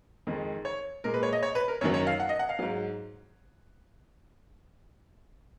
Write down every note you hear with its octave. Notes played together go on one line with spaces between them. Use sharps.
F2 D#3 G#3
C#5
A#2 G#3 A#4
B4
C#5
D#5
C#5
B4
A#4
F#2 D#3 F#3 C#5
C#5
F5
F#5
D#5
F#5
F5
G#2 F#3